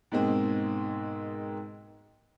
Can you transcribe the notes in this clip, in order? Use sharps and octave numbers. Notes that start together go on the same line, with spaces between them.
G#2 B2 G#3 A#3 C4